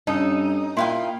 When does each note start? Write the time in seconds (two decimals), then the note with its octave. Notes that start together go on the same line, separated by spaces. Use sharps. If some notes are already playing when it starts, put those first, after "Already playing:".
0.07 G2 C#4 D#4 A4
0.77 A#2 E4 F5 G5 C6